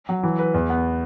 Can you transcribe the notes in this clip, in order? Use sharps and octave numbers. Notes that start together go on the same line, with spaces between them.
F#3
E3
B4
E2
B3